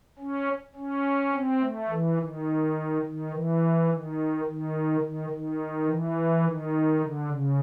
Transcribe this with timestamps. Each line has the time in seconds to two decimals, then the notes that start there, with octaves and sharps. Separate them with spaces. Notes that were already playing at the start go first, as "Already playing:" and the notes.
0.19 C#4
0.76 C#4
1.33 C4
1.61 A3
1.89 E3
2.18 D#3
3.02 D#3
3.31 E3
3.88 D#3
4.45 D#3
5.01 D#3
5.30 D#3
5.86 E3
6.43 D#3
7.00 D3
7.27 C#3